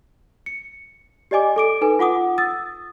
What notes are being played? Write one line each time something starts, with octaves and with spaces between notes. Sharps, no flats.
C#7
G4 D5 D#5 G#5 D6
A4 D6 D7
D#4 A4 B4 G#5
F4 F#5 D6 D#6
D#6 E6 A6